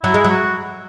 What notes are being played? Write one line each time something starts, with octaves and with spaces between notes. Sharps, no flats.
F#3 E4
G#3
F#3
F#4